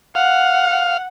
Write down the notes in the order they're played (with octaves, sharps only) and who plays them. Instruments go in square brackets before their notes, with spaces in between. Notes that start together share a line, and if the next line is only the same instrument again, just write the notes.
[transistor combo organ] F5 [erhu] F#5